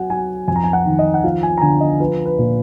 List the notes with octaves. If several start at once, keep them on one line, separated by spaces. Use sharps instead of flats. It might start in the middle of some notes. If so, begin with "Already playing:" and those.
Already playing: F#3 F#5 G#5
F#3 G#5
F2 G#5
A#5
G#5
F#5
D#3
D#5
F#5
F3 F5
G#5
A#5
D3 G#5
D#5
F3 B4
B4
A#2